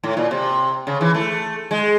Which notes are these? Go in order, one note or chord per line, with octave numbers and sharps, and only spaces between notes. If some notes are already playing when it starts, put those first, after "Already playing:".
A2
A#2
C3
C#3
E3
A3
G#3